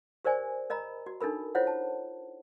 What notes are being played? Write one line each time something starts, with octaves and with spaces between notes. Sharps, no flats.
G4 A#4 C5 D5 G#5
A#4 D#5 A#5 B5
F#4
D4 D#4 A4 A#4 B5
E4 F4 C5 C#5 F#5
A5